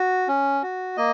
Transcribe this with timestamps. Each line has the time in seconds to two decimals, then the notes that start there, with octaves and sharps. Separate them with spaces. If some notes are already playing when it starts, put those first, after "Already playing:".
Already playing: F#4
0.28 C#4
0.63 F#4
0.97 A#3 D#5